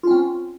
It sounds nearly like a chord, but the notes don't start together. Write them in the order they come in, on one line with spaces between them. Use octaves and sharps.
F4 C#4 C4